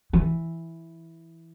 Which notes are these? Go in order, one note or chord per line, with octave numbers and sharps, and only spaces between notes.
E3